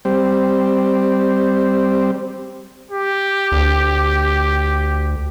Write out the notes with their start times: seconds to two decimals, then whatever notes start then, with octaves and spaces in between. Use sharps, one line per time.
0.05 G3 C4
2.90 G4
3.52 D2